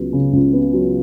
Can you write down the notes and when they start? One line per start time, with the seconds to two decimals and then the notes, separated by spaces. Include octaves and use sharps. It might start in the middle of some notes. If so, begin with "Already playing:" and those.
Already playing: C#2 F#3 B3
0.13 C#3
0.33 C#2
0.53 B3
0.73 F#3